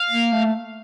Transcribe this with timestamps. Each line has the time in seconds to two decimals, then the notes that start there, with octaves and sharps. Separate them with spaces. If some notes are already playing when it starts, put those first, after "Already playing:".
Already playing: F5
0.10 A#3
0.32 A3